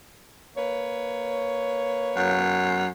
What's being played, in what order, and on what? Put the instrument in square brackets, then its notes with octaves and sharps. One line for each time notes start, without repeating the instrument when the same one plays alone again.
[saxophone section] A#3 B4 C#5
[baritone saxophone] F#2